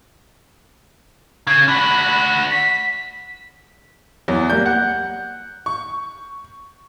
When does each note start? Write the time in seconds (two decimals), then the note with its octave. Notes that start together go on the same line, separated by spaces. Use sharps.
1.47 C#3 G#6
1.68 D4 F#4 B5
2.51 B6
4.28 E2 F#3
4.50 G3 A#3 D5 G6
4.66 F#5
5.66 C#6